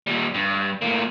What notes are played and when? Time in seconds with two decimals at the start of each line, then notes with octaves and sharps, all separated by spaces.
0.07 A#2 G3
0.34 G2
0.82 A2 A#3